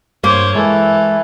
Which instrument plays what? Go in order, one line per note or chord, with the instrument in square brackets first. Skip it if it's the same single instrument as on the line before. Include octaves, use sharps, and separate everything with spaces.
[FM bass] G2 [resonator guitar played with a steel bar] A#3 [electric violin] C5 C#5
[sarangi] E3 [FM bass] G#3 [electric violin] A4